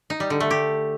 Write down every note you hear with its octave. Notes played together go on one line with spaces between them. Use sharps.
D#4
G3
D3
A3
G4